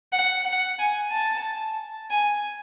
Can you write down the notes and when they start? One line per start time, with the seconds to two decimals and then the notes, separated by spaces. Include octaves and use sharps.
0.12 F#5
0.45 F#5
0.79 G#5
1.11 A5
2.11 G#5